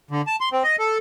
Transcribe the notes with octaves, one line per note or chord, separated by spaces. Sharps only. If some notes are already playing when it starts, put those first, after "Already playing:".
D3
A5
C6
C4
D#5
A4